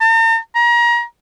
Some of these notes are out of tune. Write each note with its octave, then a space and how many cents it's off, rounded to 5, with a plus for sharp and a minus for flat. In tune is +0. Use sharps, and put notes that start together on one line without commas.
A#5 -45
A#5 +30